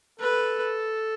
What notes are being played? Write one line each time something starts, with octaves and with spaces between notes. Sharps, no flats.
A4 B4